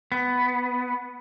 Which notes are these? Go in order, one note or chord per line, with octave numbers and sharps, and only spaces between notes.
B3